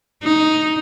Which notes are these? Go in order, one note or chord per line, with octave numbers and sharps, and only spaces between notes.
D#4